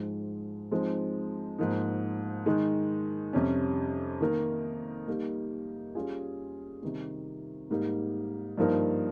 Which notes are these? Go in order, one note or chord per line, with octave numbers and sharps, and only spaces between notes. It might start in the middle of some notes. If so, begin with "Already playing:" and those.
Already playing: G#2 F3 G#3
F3 G#3 C4 D#4
G#2 F3 A#3 D#4
D#3 G#3 D#4
F2 C3 G3 C#4
D#3 A#3 D#4 A#4
G3 A#3 D#4
G3 C#4 F4 G#4
C3 D#3 G3
G#2 G3 A#3 D#4
G2 F3 A#3 D#4 A#4